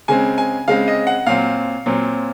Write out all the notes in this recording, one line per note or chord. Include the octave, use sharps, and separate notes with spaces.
C#3 G#3 C4 G#5
G#5
C#3 G#3 C4 F5
D#5
F#5
A#2 F#3 C4 F5
A#2 F#3 C4